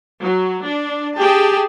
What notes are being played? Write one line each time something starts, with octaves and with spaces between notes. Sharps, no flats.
F#3
D4
G4 G#4 G5 A5